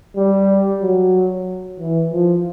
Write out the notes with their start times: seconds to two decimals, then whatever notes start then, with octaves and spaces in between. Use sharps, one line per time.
0.17 G3
0.82 F#3
1.79 E3
2.12 F3